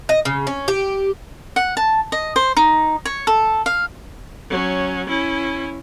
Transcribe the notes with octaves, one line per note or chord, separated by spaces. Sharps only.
D#5
C#3
C#4
G4
F#5
A5
D#5
C5
D#4
C#5
A4
F5
F#3 C#4
C#4 E4